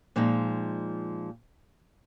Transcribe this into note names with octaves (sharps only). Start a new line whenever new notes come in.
A#2 F3 G#3 D#4